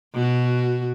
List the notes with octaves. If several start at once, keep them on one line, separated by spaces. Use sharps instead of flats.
B2 F#4